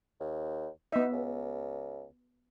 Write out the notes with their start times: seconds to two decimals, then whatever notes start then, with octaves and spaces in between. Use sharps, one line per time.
0.20 D#2
0.92 B3 D#4 E5
1.13 C#2